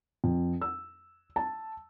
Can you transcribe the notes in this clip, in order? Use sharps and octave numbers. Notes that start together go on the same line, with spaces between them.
F2
E6
A5